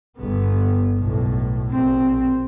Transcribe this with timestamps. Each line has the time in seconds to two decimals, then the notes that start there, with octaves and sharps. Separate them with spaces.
0.18 G1 B3
0.99 B1 A2
1.70 A#1 C4